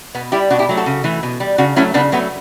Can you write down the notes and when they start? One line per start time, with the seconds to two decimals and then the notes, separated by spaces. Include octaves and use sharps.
0.15 B2 B3
0.32 G3 E4 G4
0.50 B2 D4 F#4
0.59 E4 G4
0.69 F#3 A3
0.77 F#4 A4
0.86 C#3
1.04 E3 A3
1.23 B2
1.40 G3
1.58 C#3 D4 F#4
1.76 F#3 A3 C#4 E4
1.94 C#3 B3 D4
2.12 F#3 A3 B3